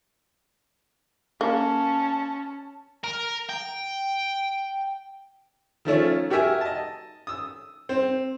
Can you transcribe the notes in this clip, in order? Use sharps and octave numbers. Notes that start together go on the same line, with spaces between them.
A#3 C#4 A5
A#4
G5
D#3 F3 A3 C#4
F#4 G4 A#4 E5 G#5
D#5 A5
D#6 E6
C4